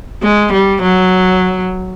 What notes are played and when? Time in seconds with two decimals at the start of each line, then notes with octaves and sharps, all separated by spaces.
0.23 G#3
0.52 G3
0.82 F#3